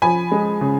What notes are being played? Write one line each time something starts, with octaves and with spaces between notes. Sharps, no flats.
F3 G#5 B5
G#3
C#3